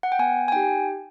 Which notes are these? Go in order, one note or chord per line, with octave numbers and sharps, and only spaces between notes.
F#5
G5
B3 G#5
G#5
D#4 G4 G5